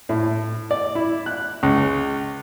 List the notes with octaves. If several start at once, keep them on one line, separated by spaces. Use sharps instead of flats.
A2
D5
E4
F#6
C#2